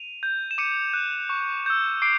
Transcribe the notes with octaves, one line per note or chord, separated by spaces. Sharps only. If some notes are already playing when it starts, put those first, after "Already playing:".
Already playing: D#7 F7
G6
E7
D6 C#7 D#7
F#6
C#6
E6 G6
D6 C7 D7